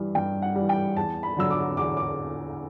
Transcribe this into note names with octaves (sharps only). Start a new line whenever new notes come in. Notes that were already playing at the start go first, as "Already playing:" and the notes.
Already playing: G2 E3 G3
G2 G5
F#5
E3 G3
G5
E2 A5
B5
D3 F#3 E6
D6
E2 D6
D6